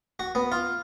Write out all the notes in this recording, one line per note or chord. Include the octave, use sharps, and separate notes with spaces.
F#4
B3
F4